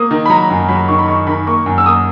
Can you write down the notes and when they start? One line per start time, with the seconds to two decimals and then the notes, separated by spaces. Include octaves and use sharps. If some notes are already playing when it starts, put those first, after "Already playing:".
Already playing: A#3 D#6
0.11 D#3
0.26 B5
0.29 F#3 A#5
0.50 F#2
0.69 F#3 B5
0.88 D#3 C#6
0.99 B5
1.08 D#3 C#6
1.27 D#3 B5
1.47 A#3 C#6
1.66 F#2
1.78 E6
1.86 A#3 D#6